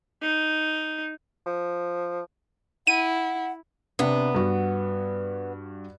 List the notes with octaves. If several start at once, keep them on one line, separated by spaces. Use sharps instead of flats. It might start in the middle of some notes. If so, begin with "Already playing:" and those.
D#4
F3
E4 F#5 D#7
C3 B3 D4
G2 F#4